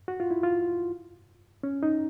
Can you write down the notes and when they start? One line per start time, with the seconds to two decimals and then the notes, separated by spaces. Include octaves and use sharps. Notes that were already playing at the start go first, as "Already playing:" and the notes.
0.08 F#4
0.20 F4
0.31 E4
0.43 F4
1.63 C#4
1.83 D#4